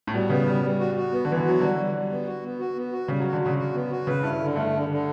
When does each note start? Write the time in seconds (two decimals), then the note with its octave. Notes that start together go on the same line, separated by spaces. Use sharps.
0.07 A2
0.14 B2 G3
0.30 C#3 B3
0.47 C#3 G3
0.63 G3
0.79 F#4
0.96 F#4
1.12 B3
1.25 D3
1.28 E3 B3
1.37 D3
1.45 F#3 F#4
1.61 D3 G3
1.77 G3
1.94 G3
2.10 B3
2.26 F#4
2.43 B3
2.59 F#4
2.76 B3
2.92 F#4
3.08 C#3 G3
3.20 F#3 F#4
3.33 D3
3.41 C#3 F#4
3.58 F#4
3.73 B3
3.90 F#4
4.07 C#3 B4
4.23 G2 E4
4.39 D3
4.56 G2 A3
4.73 D3
4.89 D3